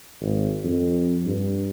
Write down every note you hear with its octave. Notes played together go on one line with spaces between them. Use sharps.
G#1
F2
G2